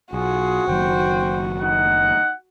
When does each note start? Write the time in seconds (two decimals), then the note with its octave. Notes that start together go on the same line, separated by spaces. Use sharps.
0.13 B1 F4 F#4 G#4
0.67 F#1 D#3 F#3 C5 G5
1.62 D#4 F#5